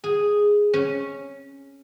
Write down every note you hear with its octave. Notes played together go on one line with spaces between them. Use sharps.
G#4
C#4